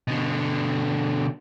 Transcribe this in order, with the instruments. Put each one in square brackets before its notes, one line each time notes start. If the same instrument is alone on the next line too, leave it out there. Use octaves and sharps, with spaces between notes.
[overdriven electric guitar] B2 D3